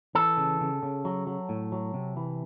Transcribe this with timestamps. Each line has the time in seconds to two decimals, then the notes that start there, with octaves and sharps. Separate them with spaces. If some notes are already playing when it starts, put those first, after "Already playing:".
0.15 E3 A4
0.37 C#3
0.61 C#3
0.83 C#3
1.05 F#3
1.27 F#3
1.49 A2
1.72 F#3
1.94 C3
2.17 E3